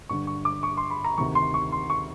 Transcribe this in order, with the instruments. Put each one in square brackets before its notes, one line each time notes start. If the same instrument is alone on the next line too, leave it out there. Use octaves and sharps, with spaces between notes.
[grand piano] G2 D3 C#6
C#6
D6
C#6
C6
B5
A#5
D2 C3 D#3 C#6
C6
C#6
C6
C#6